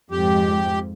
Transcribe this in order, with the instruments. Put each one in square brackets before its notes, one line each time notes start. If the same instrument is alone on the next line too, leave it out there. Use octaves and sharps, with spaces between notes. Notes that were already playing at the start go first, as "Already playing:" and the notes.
[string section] F2 G#2 [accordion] G4